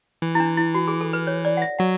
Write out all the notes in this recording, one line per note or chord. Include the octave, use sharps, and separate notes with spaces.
E3
E4
D4
E4
F#4
G#4
A4
B4
C#5
D5
F#5
E5
F#3 F#5